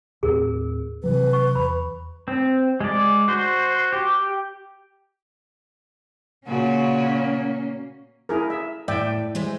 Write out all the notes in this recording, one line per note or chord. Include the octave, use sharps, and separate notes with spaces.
D#2 A2 C4 G#4 A#4
C3 E3 F#3 B4
C#6
E2 B5
C4
G#3 D5
F#4 C5
G4
A#2 C#3 A#3 C#4 F#4
E4 G#4 A#4
E5
A2 D5 E5 G5
E3 G#3 C5